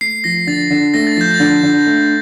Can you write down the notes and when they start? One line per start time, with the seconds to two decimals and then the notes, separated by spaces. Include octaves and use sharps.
0.01 A3 C7
0.24 F3 A#6
0.47 D3 A6
0.70 D3
0.94 A3 A#6
1.07 A6
1.17 F3 G6
1.34 A6
1.40 D3
1.63 D3
1.87 A3